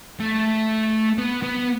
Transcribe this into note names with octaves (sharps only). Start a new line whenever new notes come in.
A3
B3
B3